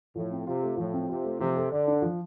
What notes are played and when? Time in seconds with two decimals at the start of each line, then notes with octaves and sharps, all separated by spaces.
0.15 A2 F3
0.32 C4
0.47 C3 F4
0.63 A3
0.77 A2 F3
0.93 C4
1.09 C3 F4
1.24 A3
1.40 C3 F3
1.56 A4
1.71 D3 D5
1.88 D4
2.02 F3